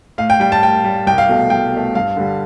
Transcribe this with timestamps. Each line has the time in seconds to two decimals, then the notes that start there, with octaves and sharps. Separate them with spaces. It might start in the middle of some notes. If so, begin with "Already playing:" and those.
0.18 A2 F5
0.30 G5
0.40 G3 G5
0.52 A5
0.62 A2 G5
0.85 G3
1.07 C2 G5
1.18 F5
1.29 B2 A3
1.50 C2 G5
1.72 B2 A3
1.95 G2 F5
2.17 D3 G3